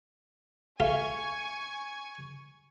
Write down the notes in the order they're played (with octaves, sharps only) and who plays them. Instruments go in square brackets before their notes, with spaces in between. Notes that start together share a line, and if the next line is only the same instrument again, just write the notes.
[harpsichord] A3 F4 F5 [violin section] G#5 C#6 G#6